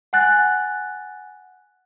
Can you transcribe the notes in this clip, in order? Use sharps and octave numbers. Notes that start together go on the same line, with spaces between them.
F#5 G#5 F#6 A6